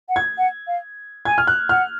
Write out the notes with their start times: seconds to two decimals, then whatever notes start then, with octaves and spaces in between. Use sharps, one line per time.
0.09 F#5
0.16 G#6
0.38 F#5
0.67 F5
1.25 G#5 G#6
1.38 F6
1.47 F#6
1.69 F#5 F6